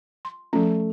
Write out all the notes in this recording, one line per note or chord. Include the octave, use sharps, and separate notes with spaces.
C6
F3 A3 C#4